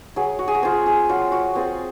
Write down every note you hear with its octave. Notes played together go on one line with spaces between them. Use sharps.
F#3 G#4
F#4
G#4
F#4
C4 F4 G#4
G#4
F#3 F4
F#4
C4 F4 G#4